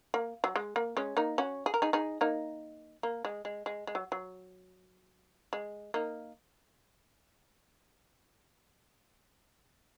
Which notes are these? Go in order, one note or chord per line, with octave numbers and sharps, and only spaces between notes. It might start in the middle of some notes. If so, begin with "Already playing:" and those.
A#3
F#3
G#3
A#3
G#3 C#4
A#3 D#4
C#4 F#4
G#4
A#4
D#4 G#4
D#4 G#4
A#3 D#4
A#3
G#3
G#3
G#3
G#3
F#3
F#3
G#3
A#3 D#4